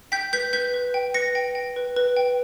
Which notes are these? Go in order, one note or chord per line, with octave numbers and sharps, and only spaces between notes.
G5 G6 B6
B4 G6 B6
B4 G6 B6
B4
G5
B4 A#6 C#7
G5
G5
B4
B4
G5